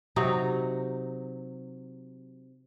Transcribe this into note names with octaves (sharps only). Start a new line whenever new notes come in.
C3 F#3 D#4